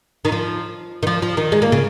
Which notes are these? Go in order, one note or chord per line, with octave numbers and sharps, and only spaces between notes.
D#3
F3
D#3
F3
F3
D#3
G#3
A#3
C#3